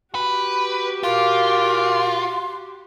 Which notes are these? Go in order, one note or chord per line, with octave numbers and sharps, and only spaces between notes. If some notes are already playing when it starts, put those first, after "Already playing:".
F#4 G4 B4
A#2 F4 A#4 C6 D6